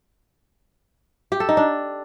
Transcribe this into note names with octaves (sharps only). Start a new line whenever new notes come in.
G4
A4
D#4
D4